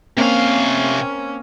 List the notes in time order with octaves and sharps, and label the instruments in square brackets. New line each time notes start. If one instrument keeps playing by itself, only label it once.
[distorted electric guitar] C3 F5 [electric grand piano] A#3 C4 [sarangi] C#4